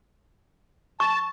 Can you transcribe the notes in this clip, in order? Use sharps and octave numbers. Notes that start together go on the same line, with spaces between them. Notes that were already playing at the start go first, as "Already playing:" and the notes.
A5 C#6